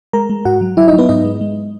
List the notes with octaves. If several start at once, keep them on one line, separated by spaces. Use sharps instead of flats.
G#3 A#4 A#5
G#3
G#2 F#4 F#5
F#3
F#3 E4 E5
D#4 D#5
F#3
B3 B4
G#2 D#4 D#5
G#3
G#3